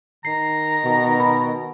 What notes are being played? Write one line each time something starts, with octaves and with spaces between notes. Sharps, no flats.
D#3 A#5 C7
B2
B5